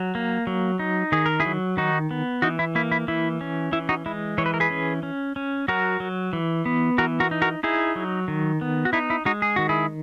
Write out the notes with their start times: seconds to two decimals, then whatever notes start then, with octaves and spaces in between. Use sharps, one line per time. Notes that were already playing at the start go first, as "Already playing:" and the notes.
Already playing: F#3
0.15 A#3
0.47 F#3
0.79 D#4
1.12 D#3 G#4
1.26 A#4
1.40 E4 G#4
1.45 F#3
1.77 D#3 D#4 F#4
2.11 B3
2.42 E3 D#4 F#4
2.59 E4
2.75 A#3 E4
2.92 E4
3.08 E3 E4
3.41 C#4
3.72 E3 E4
3.89 D#4 F#4
4.06 G#3 E4
4.38 E3 C#5
4.46 B4
4.54 A#4
4.60 G#4 B4
4.70 C#4
5.03 C#4
5.36 C#4
5.68 F#3 F#4 A#4
6.00 F#3
6.33 E3
6.65 B3
6.98 E3 F#4 A#4
7.20 F#4 A#4
7.31 D#4
7.42 F#4 A#4
7.63 D#4 E4 G#4
7.96 F#3
8.28 D#3
8.61 B3
8.85 F#4
8.93 D#4 E4
9.10 E4
9.25 G#3 D#4 F#4
9.42 G#4
9.56 D#3 F#4
9.69 E4 G#4